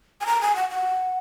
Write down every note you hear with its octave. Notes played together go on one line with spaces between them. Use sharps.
G#5
A#5
G#5
F#5
F#5